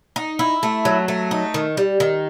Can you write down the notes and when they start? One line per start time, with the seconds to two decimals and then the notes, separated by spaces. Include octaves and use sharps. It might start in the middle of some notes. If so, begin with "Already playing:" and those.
0.16 D#4
0.39 E4
0.63 A3
0.85 F#3
1.08 A3
1.31 D#4
1.54 D#3
1.77 G3
2.00 D#3